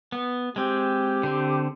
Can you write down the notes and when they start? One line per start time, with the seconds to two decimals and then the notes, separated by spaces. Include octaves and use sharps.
0.12 B3
0.56 G#3 C4 G4
1.23 D3 C4